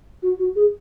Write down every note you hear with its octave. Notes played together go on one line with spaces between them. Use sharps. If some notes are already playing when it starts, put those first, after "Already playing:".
F#4
F#4
G#4